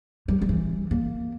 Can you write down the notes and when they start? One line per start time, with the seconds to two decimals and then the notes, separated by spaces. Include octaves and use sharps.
0.28 G3
0.41 G3
0.49 E3
0.91 A#3